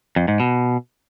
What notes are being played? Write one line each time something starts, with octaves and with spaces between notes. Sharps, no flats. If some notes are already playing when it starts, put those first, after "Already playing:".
F2
G#2
B2